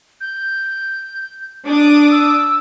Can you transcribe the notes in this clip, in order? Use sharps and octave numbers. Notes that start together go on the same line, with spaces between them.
G6
D4 D6 D#6
E6